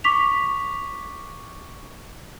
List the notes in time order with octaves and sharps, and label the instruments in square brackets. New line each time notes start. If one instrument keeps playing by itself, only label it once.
[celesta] C#6 D6 B6 F7